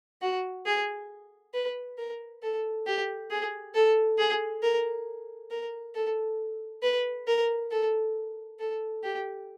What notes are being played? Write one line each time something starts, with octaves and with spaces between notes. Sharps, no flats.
F#4
G#4
B4
A#4
A4
G4
G#4
A4
G#4
A#4
A#4
A4
B4
A#4
A4
A4
G4